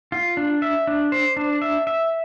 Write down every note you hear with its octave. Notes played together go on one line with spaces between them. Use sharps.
F4
D4
E5
D4
C5
D4
E5
E5